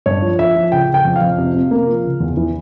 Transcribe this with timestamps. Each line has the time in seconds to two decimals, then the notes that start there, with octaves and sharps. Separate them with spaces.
0.06 G2 C#5
0.22 F3
0.39 F3 E5
0.56 F3
0.72 C#3 G5
0.89 C#3
0.94 G5
1.05 F2
1.16 F5
1.21 F2
1.38 C3
1.54 C3
1.71 A#3
1.87 F3
2.04 C#3
2.20 E2
2.37 E3